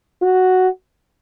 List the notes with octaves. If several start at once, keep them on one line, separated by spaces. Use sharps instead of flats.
F#4